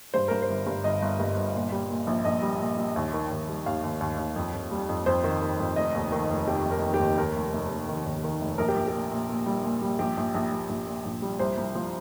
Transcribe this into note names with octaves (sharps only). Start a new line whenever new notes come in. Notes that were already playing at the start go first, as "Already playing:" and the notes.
G2 C5
G2 A#4
C5
G1
G2
G1 D#5
G1
G2
G1
A#2
G3
A#2
A#1
A#1 D#5
G3
A#2
G3
D#2
D#3
D#2
G3
D#2 F5
D#2
D#2
D#2
F2
F2
G3
F2
F2 C5
D#3
D#3
F2
F1 D#5
D#2
D#3
F1
F1 G4
F1
A#4
D#3
G4
D#2
D#2 A#4
F1
F1
F1
D#3
D#2
D#3
F1
A#1 A#4
G4
A#1
G4
A#2
A#2
A#2
G3
A#2
G3
A#1 G4
A#1
A#1
A#1
A#1
A#2
A#1
G3
C2 C5
C2
F3